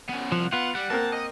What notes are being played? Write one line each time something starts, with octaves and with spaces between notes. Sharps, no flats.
B3 C#4
C2 F3 F#5
B3 F4 F#5
G3 F#5
A#3 C4 A#4 A5
D#5